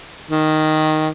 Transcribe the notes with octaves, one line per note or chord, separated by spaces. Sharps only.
D#3